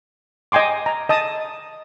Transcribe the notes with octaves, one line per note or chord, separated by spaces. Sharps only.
D#5 G5 G#5 C6 D6
A#5
D#5 A5 D#6